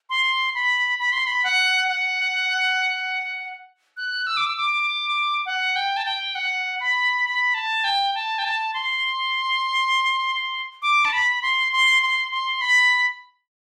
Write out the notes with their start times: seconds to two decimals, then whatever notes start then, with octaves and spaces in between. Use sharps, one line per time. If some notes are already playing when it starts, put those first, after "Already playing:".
0.10 C6
0.55 B5
0.99 B5
1.12 C6
1.27 B5
1.44 F#5
1.88 F#5
3.97 F#6
4.27 E6
4.37 D6
4.46 E6
4.57 D6
5.46 F#5
5.76 G5
5.97 A5
6.05 G5
6.35 F#5
6.80 B5
7.25 B5
7.54 A5
7.84 G5
8.15 A5
8.38 G5
8.44 A5
8.74 C6
10.82 D6
11.05 A5
11.13 B5
11.42 C6
11.73 C6
12.03 C6
12.32 C6
12.61 B5